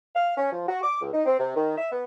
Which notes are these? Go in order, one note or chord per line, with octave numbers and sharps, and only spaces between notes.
F5
C#4
F3
F#4
D6
C#2
D#4
C4
C3
D#3
E5
B3